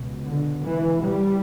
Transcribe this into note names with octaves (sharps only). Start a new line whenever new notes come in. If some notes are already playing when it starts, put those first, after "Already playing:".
Already playing: C#2 B2
D3
E3
G3